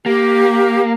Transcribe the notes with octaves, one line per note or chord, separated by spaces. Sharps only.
A#3 G4